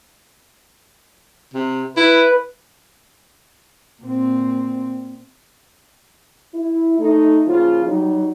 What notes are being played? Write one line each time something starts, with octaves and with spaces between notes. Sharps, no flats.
C3
E4 B4
A#2 C4
E4
A3 D#4
A#2 C#3 F3 F4
F#3 G3 D#4